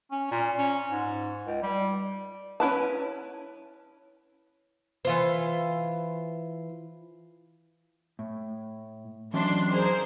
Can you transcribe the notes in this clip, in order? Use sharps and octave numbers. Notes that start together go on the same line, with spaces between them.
C#4
A#2
C#4
G#2
C#2
G3
C#4 E4 B4 A5
E3 F4 C5
A2
E3 F#3 C#4 D4 C6
G#4 A#4 C5